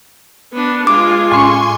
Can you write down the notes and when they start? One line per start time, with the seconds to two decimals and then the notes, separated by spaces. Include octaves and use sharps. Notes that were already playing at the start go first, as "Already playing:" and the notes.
0.53 B3 D4
0.87 G#3 F4 D6
1.31 A2 C#4 G#5 C6 C#6